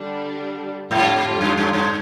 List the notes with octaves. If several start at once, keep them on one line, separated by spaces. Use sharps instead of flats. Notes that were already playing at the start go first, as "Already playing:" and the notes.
Already playing: D3 G3 D4
F2 G#2 D3 G3 D4 F4
G2
G2
G2